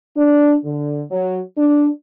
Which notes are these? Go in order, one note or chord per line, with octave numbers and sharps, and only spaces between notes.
D4
D3
F#3
D4